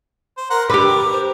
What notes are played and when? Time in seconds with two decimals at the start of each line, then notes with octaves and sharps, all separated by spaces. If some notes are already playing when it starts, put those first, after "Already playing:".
0.37 C5
0.50 A#4 F#5 A#5 C6
0.70 D3 G4 B4 D6
0.87 A#4
1.12 C5